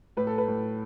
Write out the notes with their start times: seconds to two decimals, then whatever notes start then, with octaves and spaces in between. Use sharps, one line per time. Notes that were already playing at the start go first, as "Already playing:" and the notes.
0.17 A2 B4
0.27 A4
0.38 B4
0.48 A2